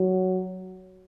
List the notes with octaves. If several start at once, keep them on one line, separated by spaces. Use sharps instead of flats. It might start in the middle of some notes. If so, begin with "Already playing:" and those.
Already playing: F#3